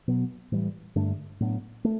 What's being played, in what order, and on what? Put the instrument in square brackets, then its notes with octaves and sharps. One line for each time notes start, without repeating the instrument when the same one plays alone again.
[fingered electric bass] B2 F#3 B3
A2 E3 G3
G2 D3 A3 D4
A2 F#3 B3 D4
A3